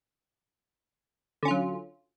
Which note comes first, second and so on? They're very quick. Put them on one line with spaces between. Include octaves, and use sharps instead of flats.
D3 C#4 F4 F#3